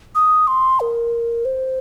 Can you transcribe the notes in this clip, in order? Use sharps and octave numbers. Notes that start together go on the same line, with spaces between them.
D#6
C6
A#4
C5